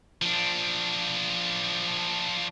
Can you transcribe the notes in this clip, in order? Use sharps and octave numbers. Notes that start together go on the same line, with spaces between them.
F3 D4